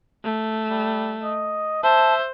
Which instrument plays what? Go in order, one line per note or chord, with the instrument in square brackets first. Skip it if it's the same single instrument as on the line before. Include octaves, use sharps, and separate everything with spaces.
[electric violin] A3
[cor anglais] G3
D#5
[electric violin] C5 [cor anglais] E5 [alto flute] A5